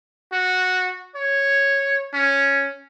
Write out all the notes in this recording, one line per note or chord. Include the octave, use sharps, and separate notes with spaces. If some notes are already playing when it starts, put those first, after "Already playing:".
F#4
C#5
C#4